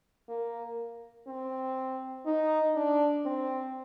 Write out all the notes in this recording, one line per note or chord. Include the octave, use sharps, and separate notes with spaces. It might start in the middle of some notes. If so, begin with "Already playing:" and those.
A#3
C4
D#4
D4
C4